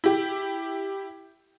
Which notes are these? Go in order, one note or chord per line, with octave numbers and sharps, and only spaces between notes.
E4 G4